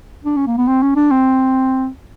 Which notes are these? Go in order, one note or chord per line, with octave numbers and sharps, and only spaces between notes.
D4
C#4
A#3
B3
C4
C#4
D4
C4